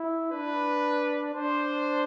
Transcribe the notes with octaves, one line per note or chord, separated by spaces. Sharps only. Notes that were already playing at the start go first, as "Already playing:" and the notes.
Already playing: E4
D4 B4
D4 C5